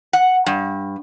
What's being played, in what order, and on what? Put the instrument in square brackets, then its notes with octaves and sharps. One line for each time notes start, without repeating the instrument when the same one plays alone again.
[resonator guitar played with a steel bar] F#5
G2